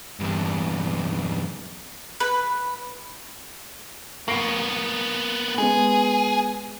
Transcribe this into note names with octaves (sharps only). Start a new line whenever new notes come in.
E2 G2
B4
A#3 B3 C#6 C7 D7
G#3 B3 G#4